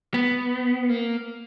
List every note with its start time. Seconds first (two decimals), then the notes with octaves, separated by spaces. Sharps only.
0.14 B3
0.89 A#3